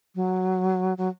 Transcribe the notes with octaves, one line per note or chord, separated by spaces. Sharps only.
F#3
F#3